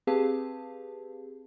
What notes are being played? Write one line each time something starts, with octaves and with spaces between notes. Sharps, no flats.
C4 G4 G#4 B4 F5 A5